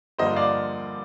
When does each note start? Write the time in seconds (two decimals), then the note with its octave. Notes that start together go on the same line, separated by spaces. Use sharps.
0.18 G2 D3 F3 A#3 C5 D#5
0.36 D5 F5